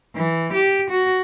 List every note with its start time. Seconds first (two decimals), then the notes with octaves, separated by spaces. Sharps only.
0.15 E3
0.53 G4
0.90 F#4